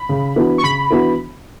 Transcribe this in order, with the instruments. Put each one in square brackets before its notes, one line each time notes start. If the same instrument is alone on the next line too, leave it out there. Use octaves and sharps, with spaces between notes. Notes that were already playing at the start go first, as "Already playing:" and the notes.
Already playing: [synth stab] B5
[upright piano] C#3
E3 B3 D4 F#4
[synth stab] C#6
[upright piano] C#3 [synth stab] B5
[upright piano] E3 B3 D4 F#4